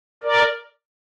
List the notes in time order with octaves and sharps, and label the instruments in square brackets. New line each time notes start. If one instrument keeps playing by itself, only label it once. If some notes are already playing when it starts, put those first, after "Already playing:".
[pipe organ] A#4 D5